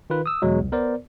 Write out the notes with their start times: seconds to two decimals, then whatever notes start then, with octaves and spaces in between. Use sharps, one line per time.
0.10 D#3 F4 B4
0.26 D#6 E6
0.42 E2 B2 F#3 G#3
0.60 C2
0.72 B3 A#4 C5 D5